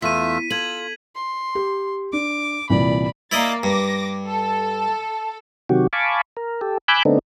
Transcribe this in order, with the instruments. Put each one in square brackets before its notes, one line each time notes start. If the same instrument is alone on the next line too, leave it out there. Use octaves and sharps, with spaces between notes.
[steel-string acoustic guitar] E2 [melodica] A3 F4 E5 [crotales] B6 D#7
[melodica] F4 [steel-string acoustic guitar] A4 [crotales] G#6 F#7
[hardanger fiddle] C6
[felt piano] G4
[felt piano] D4 [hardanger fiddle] D6
[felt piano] C2 A#2 E3 [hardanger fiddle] D5 B5
[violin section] A#3 A6 [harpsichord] E4 D5 D#5
[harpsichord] G2 [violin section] D6 A#6
[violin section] A4 [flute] A5
[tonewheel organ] C3 D#3 F#3 F#4 G4
F5 G#5 A5 B5 C#6 D6
A#4
G4 A4
G#5 B5 D6 E6 F#6 G6
D3 A3 B3 C4 D4 D#4